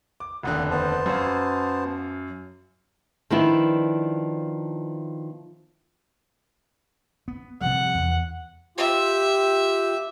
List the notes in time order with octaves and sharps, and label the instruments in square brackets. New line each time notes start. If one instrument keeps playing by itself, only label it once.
[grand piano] D6
[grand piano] F1 D#2 D3 [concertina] F#5
[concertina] B3 C5 A5
[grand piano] F#2 C#4 F5
[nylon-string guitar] D#3 F3 B3 D4 E4
[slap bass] B3
[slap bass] C3 F3 G3 [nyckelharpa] F#5
[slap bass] E2
[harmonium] F4 G4 [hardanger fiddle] E5